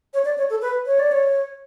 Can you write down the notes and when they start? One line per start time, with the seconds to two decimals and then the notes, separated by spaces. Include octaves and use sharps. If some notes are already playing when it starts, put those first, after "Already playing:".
0.13 C#5
0.25 D5
0.38 C#5
0.50 A4
0.62 B4
0.86 C#5
0.99 D5
1.12 C#5